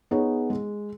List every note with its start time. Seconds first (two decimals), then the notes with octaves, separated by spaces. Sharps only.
0.11 B3 D#4 G#4 C#5
0.50 G#3